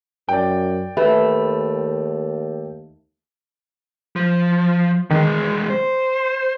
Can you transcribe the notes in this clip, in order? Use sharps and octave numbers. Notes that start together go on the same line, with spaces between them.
F#2 D5 G5
D#2 A3 B4
F3
E2 D#3 G#3
C5